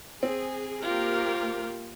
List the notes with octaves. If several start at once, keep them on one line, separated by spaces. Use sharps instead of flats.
C4 G#4
A#3 F4 G4 A#4